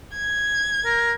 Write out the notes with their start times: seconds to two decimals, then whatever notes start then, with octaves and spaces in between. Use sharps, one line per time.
0.15 G#6
0.85 A#4